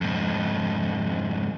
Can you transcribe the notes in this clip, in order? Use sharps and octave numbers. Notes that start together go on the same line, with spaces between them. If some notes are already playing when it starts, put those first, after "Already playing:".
F2 G#2